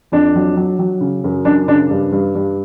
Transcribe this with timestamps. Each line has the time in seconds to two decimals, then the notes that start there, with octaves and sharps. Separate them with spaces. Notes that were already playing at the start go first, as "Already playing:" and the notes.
0.12 F2 D4
0.35 F#3
0.56 F#3
0.79 F#3
1.01 C#3
1.24 F#2
1.45 F#2 D4
1.67 C#3 D4
1.90 G2
2.12 G2
2.35 G2